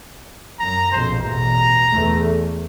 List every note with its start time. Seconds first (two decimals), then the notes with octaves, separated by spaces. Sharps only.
0.59 F#2 A#5
0.92 A#1 F2 B2 C5
1.21 A1 E2 B2 A#5
1.93 E2 A3